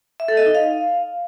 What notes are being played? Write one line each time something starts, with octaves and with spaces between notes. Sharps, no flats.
E5
A4
D#5
D#4
F5